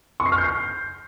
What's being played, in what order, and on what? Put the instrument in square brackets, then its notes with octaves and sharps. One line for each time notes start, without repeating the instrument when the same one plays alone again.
[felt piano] C#6
C7
F6
G6
C7